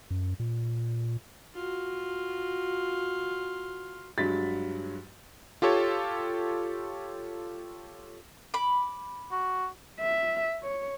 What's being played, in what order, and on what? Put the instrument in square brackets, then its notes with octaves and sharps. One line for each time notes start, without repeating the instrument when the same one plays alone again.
[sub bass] F#2
A#2
[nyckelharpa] F4 F#4
[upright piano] G2 F#3 G#3 A6 B6
[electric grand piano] F4 G4 A4 C#5
[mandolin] B5 D6
[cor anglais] F#4
[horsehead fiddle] E5
C#5